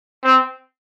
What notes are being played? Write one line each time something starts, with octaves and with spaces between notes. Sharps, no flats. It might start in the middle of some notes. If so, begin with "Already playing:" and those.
C4